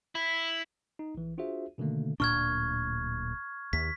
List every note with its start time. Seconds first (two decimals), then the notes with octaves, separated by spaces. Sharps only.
0.15 E4
0.99 D#4
1.15 A#1 E3
1.38 D4 F4 F#4 G#4 C5 E5
1.78 B2 D3 D#3 A3 A#3
2.20 D1 A#2 D4 C#6 F6 G#6
3.73 D#2 B6